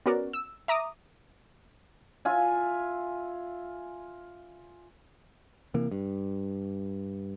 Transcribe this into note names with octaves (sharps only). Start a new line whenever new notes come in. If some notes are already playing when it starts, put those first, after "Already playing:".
B3 C#4 F#4 A#4 D5
E6
E5 A#5 D6 D#6
F4 E5 G#5
C3 E3 A#3
G2